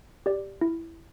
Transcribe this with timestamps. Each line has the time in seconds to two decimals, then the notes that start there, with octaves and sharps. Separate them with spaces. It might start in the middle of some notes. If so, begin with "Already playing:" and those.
0.26 G4 D5
0.61 E4